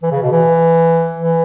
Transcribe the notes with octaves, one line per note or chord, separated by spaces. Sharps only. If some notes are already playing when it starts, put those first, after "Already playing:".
E3
C#3
B2
E3
E3